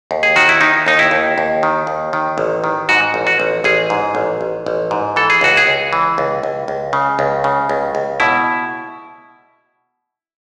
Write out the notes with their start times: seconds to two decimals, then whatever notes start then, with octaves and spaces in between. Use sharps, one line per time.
0.11 D#2
0.23 G#4
0.36 D#3 F#4
0.49 E4
0.61 D#3 D#4
0.86 D#2 D#4
0.99 E4
1.11 D#2
1.38 D#2
1.63 D#3
1.87 D#2
2.13 D#3
2.38 A1
2.64 D#3
2.89 G#2 F#4
3.14 A1
3.27 F#4
3.40 A1
3.64 A1 G#4
3.90 G#2
4.15 A1
4.41 A1
4.66 A1
4.91 G#2
5.16 E3 A4
5.30 G#4
5.41 C#2 F#4
5.57 G#4
5.67 C#2
5.93 E3
6.18 C#2
6.43 C#2
6.68 C#2
6.93 C#3
7.19 C#2
7.44 C#3
7.69 C#2
7.95 C#2
8.20 B2 E4